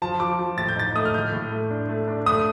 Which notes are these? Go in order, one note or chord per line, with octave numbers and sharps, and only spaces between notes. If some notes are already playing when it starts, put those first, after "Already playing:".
F3 A5
F3 D6
F3
A2 A6
G6
D#4 A6
A3 D#6
F6
A2 G6
A2
A3
D4
A3
D4
A3 D#6